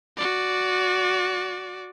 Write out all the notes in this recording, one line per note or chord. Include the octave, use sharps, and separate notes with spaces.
F#4 D5